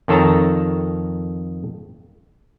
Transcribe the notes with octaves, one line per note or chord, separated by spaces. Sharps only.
F2 D#3 A4 C#5 A5 A#5